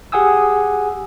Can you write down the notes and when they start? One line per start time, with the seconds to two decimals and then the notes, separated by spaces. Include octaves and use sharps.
0.12 G4 G#4 F#5 G#5 D#6 E6